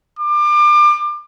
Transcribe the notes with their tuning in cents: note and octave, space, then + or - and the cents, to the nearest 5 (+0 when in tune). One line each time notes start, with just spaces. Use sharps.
D6 +30